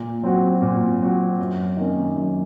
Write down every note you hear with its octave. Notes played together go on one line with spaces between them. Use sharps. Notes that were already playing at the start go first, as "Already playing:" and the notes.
Already playing: A#2
F#3 C4 F#4
A#2
F#3 C4 F#4
F#2
D#3 A#3 C#4
F#2